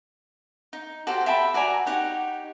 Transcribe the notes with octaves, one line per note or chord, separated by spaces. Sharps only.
D#4
F#4 G4 A4 C5
E5 G5 A5 B5
F#4 D5 G#5 A#5
D#4 G4 C#5 F#5